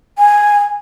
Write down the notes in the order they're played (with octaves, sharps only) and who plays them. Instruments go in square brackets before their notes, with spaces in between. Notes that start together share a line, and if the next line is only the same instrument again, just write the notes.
[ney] G#5